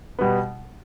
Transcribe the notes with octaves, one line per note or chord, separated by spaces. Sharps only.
B2 G3 B3